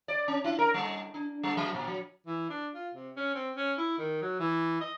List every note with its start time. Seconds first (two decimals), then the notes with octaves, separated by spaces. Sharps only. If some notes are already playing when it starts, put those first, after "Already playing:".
0.08 D5
0.28 C#4
0.44 E4
0.59 A#4
0.74 G3
1.14 D4
1.43 G3
1.57 F#3
1.74 A#2
1.87 F#3
2.26 E3
2.49 D4
2.75 F4
2.94 C3
3.16 C#4
3.34 C4
3.56 C#4
3.78 E4
3.98 D#3
4.22 F#3
4.40 E3
4.81 D#5